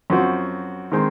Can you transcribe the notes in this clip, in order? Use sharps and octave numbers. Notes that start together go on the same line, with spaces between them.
F#2 F3 C4 F#4
D#3 G#3 C4